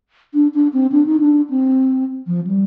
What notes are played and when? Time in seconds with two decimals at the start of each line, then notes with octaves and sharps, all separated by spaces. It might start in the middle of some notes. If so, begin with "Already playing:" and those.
0.34 D4
0.54 D4
0.73 C4
0.92 D4
1.06 D#4
1.20 D4
1.50 C4
2.27 F3
2.47 G3